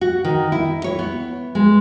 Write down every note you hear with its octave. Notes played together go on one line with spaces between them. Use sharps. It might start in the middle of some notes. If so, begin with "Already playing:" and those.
F#4
D#3
E4
C#5
B3
G#3